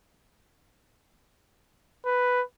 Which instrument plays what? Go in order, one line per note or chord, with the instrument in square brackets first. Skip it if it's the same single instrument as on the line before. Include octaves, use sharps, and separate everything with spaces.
[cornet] B4